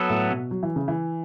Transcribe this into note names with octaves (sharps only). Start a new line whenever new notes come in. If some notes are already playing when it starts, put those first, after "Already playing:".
Already playing: F#3 B3 A4
A2
B2
F#3
E3
C#3
E3